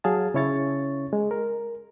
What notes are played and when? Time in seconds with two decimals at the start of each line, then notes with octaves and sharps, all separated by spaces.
0.04 F#3 G#4 F5 A5
0.34 C#3 C#4 E4 C#5 C#6 A6
1.13 G#3
1.31 A#4